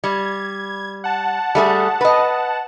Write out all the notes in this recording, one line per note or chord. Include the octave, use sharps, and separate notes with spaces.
G3 G#6
F#5 A5
G3 A3 G#4
B4 D#5